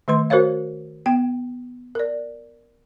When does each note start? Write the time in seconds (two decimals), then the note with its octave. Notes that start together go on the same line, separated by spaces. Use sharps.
0.08 D#3 A3 B4 C6
0.30 F#4 A#4 C5 C#5 F5
1.06 B3 G5
1.95 A#4 D5